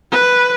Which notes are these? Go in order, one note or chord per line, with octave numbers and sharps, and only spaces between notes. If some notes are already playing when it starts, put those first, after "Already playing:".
B4